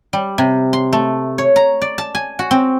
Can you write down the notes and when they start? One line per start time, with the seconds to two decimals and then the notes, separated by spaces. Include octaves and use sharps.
0.13 G3
0.38 C3
0.73 C6
0.93 A3
1.38 C#5
1.56 A#5
1.82 D5
1.98 A5
2.15 G#5
2.39 F#4
2.51 C4